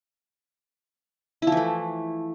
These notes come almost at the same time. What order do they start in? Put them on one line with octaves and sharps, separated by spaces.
E4 F3 E3 A3